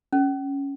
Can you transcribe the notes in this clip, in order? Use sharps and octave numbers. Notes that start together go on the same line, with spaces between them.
C#4